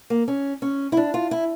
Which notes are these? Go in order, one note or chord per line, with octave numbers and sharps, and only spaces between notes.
A#3
C#4
C#4
E4
D4
F4
E4